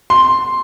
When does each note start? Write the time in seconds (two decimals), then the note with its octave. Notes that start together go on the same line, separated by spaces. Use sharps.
0.10 C6